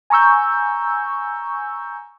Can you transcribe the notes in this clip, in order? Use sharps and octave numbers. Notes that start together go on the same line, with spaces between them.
G#5 A#5 C#6 E6 G6